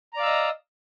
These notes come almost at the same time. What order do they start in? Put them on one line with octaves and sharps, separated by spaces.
A#5 D5 F5 E6 D#5